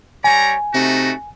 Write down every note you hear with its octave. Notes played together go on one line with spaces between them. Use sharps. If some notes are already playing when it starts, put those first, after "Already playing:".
G3 C#5 G#5 A#5
C3 A3 D#4 F#4